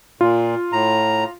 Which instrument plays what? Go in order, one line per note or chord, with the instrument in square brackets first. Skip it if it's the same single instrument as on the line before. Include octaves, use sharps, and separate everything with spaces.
[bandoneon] A#2 [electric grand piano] F4
[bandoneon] A2 A#5